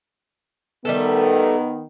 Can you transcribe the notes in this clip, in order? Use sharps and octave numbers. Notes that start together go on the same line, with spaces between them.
D#3 G3 A3 B3 A4